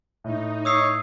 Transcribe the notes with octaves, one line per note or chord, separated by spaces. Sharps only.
A2 D#4
C#5 D#6 E6 C7